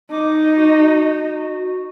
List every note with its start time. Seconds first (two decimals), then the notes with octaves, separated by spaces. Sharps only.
0.11 D#4 D6
0.57 F#4